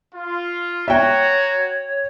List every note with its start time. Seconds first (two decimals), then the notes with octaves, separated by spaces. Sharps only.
0.14 F4
0.88 F#4 C#5 E5 G5 A#5